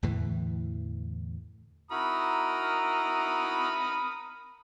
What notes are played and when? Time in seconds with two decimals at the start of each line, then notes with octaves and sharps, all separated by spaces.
0.03 E2 A2 D3 E3
1.91 E4 F#4 A#4 A#5 B5 D#6